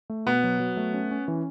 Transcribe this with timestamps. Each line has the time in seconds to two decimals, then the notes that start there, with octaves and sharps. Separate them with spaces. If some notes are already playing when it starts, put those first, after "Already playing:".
0.10 A3
0.26 B2 B3
0.44 F#3
0.60 F#3
0.77 A3
0.94 C#4
1.11 C#4
1.28 E3